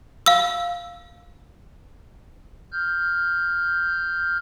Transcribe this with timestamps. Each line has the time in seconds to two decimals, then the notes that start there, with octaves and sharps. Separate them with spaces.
0.26 F5 E6
2.72 F6 G6